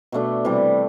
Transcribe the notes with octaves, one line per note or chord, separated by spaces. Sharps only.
B2 A3 D4
C3 E3 G3